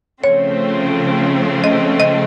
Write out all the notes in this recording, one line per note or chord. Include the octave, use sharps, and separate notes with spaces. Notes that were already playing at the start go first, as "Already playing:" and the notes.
C#3 F3 A3 C4 C#5
D#5
D#5